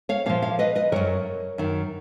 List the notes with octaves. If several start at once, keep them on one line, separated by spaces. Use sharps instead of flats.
C#5 F5
A#2 F3 C#5 F5
C#5 F5
B4 D#5
B4 D#5
F#2 D#3 A#4 C#5
F#2 D#3